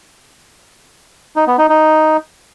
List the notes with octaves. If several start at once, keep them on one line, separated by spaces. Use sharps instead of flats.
D#4
B3
D#4
D#4